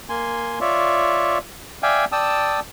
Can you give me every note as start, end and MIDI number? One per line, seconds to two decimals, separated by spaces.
0.09 0.59 58
0.09 0.59 80
0.09 0.59 84
0.61 1.38 65
0.61 1.38 73
0.61 1.38 74
0.61 1.38 76
1.83 2.05 74
1.83 2.05 76
1.83 2.05 77
1.83 2.05 79
1.83 2.05 80
2.12 2.60 74
2.12 2.60 79
2.12 2.60 81
2.12 2.60 87
2.12 2.60 88